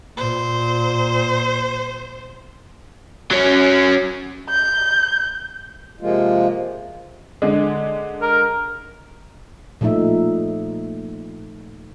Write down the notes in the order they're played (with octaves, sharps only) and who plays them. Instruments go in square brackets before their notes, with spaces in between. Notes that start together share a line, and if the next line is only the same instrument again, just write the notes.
[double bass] A#2 [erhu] C5
[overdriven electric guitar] F#3 C#4
[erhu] G6
[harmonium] C3 F3 G#3 A#3 F4
[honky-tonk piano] D3 G#3
[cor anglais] A#4
[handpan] A#2 F3 A3 D#4 E5